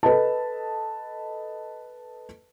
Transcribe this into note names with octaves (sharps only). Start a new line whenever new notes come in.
A4 B4 D#5 A5